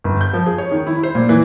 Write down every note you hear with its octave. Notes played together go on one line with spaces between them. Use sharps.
G1
G6
F3
G#4
C#5
D#3
E4
C5
A#2
E3